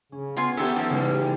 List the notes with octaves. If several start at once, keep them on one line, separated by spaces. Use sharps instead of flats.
C#3 C#4
B3 F4 G#5 C6
B3 C#4 D#4 G4 A4 E5
F3 C4 A4 C#5
C#3 E3 G3 G#3
A1 G4